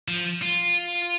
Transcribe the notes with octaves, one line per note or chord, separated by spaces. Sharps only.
F3
F4